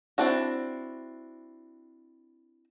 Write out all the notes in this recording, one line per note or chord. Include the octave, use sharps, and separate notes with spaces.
C4 D4 E4 F#4